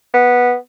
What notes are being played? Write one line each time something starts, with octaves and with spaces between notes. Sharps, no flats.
B3